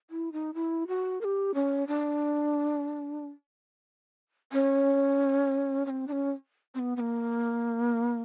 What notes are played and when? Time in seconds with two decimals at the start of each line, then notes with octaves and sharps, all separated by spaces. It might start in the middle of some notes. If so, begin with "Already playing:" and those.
0.10 E4
0.32 D#4
0.54 E4
0.88 F#4
1.21 A#4
1.24 G4
1.54 C#4
1.87 D4
4.52 C#4
5.86 C#4
5.90 C4
6.07 D4
6.12 C#4
6.74 C4
6.79 B3
6.96 B3
7.00 A#3